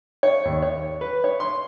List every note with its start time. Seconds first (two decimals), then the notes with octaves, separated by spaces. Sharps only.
0.23 C#5
0.45 D#2
0.62 C#5
1.01 B4
1.24 C#5
1.40 C6